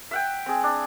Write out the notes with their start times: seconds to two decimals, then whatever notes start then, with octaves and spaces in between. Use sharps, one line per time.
0.11 E5 F#5 G5
0.46 C4 G#4
0.64 D4